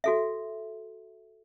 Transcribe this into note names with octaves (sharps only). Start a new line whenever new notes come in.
F#4 A4 E5